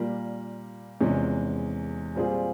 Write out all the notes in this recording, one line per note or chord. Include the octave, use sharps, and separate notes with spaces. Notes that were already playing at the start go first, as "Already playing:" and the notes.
Already playing: A#2 G3 A#3
E2 C3 F3 G#3 C#4
A#2 G3 C4 F4 G#4